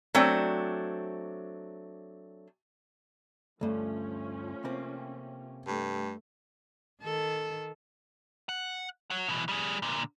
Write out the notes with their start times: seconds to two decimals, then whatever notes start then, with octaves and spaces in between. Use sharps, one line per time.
0.15 F#3 A3 C4 D4
3.61 D2 G2 F3 A3 C#4
4.64 C3 A#3 C4
5.67 G2 A3
7.02 D#3 A4
8.49 F#5
9.10 C#5 F#5
9.29 B2 E3
9.49 G3 G#4
9.82 A#2 D3